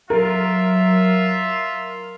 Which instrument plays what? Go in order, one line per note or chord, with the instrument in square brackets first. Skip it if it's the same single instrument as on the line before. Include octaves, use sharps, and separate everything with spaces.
[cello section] F#3 [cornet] F4 [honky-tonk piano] A#4 [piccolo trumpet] E5